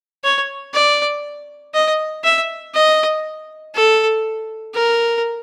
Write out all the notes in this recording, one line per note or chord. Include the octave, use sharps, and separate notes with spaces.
C#5
D5
D#5
E5
D#5
A4
A#4